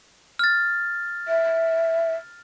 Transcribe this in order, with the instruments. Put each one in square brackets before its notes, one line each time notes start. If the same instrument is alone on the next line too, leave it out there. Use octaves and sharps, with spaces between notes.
[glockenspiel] F6 A6
[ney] E5